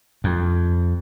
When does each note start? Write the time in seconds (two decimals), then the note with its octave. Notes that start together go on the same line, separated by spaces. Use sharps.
0.24 F2